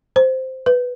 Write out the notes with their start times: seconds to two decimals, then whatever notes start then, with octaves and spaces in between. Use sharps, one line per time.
0.16 C5
0.66 B4